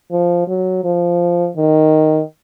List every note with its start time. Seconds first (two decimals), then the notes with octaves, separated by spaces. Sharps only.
0.11 F3
0.48 F#3
0.83 F3
1.56 D#3